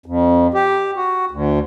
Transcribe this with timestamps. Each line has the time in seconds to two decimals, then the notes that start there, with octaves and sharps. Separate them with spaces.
0.06 F2
0.54 G4
0.96 F#4
1.31 D2